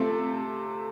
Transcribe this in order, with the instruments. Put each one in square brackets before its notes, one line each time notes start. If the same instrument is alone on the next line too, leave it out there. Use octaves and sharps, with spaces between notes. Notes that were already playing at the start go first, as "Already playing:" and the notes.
Already playing: [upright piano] C3 A3 C4 F4 A4